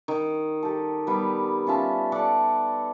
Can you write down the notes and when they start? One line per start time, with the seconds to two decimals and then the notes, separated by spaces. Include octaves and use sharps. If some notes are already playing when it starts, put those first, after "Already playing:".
0.08 D#3
0.63 G4 A4
1.07 G3 B3
1.67 C#4 F4 E5 A5
2.12 A4 D5 F#5